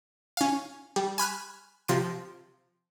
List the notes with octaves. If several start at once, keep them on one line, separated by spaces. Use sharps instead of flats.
C#4 F5
G3
G#5 B5 F6 F#6
C3 F3 C6 D7